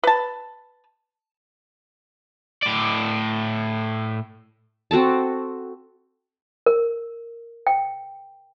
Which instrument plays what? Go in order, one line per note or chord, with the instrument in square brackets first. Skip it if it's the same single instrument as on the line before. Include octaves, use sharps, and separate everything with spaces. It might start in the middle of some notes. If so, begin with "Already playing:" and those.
[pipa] B4 A5
[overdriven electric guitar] A2 D5
[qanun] C4 F#4 A4 A5
[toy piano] A#4
G5